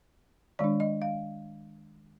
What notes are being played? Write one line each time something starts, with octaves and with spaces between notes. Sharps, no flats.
D#3 G#3 D4 D5
D#5
F5